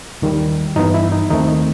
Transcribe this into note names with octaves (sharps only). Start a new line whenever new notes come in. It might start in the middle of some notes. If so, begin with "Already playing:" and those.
D#2 D#3 G3
G2 E3 B3 D#4
E4
D#4
D#2 D#3 A3 C4 D#4
D#4